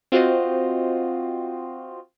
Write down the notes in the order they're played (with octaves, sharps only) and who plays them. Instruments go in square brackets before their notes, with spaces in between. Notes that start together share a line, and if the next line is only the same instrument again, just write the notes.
[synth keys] C4 F4 F#4 C5 D#5